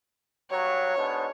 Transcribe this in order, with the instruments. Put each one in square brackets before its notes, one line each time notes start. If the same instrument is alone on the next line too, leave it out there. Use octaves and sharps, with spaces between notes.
[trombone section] G2 F#3 [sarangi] C#5
[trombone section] G#2 B2 D4